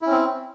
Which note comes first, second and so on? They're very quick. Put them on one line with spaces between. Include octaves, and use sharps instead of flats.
E4 C#4 C4